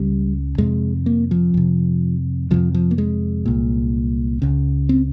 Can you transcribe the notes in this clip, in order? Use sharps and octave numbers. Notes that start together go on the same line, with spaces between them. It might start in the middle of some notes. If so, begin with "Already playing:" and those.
Already playing: C#2 C#3 G3
F2 C3 G#3
A#3
F3
F2 C3
F2 C3 F3
F3
A#3
G#3
C2 A#2
C#2 C#3
C4